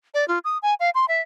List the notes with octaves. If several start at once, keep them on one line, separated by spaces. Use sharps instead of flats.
D5
F4
D#6
G#5
F5
C6
E5